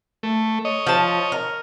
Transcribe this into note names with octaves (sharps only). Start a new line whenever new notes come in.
A3
C#5 D#5
F3 A5
A#4